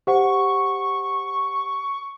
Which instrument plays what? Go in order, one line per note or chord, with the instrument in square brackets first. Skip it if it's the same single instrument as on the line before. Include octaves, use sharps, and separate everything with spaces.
[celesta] G4 C5 F#5 [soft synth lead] C#6